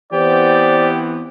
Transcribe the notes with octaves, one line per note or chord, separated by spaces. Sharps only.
E3 B3 C4 G4 C5 D5